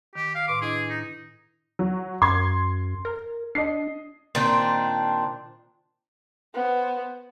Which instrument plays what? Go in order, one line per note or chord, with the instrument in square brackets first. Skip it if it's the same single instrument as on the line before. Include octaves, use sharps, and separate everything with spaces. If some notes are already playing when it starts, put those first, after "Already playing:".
[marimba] D#3 [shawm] G4
[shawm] F5
[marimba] A2 B4 C6 [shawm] D6
[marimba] D4 E4 D#5 [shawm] G#4
[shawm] D#4
[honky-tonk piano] F#3
[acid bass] F#2 [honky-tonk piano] C6 G#6
[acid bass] A#4
[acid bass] D4 [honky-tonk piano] D#5 C7
[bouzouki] A#2 D#3 C4 D4
[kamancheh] B3 C5